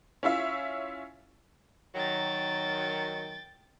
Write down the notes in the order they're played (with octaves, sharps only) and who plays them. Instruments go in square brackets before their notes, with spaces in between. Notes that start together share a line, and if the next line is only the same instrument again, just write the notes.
[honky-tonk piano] C#4 E4 F4 E5
[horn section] D#3 F#3 [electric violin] G5 A6